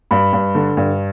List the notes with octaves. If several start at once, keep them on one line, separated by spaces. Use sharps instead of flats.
G2 B5
G2
D3
G2